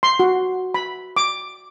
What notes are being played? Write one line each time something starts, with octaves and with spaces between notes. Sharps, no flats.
C6
F#4
B5
D6